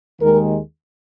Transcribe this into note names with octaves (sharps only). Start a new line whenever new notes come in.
D#2 D#3 G#3 A#4